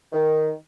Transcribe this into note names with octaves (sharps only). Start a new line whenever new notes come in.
D#3